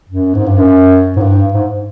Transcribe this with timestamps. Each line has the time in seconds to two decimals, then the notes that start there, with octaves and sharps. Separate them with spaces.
0.09 F#2
0.35 G#2
0.46 G2
0.57 F#2
1.16 G#2
1.20 G2
1.53 G#2